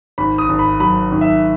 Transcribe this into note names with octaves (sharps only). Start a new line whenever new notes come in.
G#1 B5
D#6
G#1
B5
F#3 B5
G#1
E5